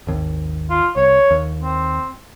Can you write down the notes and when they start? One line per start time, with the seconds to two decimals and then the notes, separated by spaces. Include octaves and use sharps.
0.07 G#1 D#2
0.70 F4
0.96 C2 C#5
1.31 D#2
1.63 C4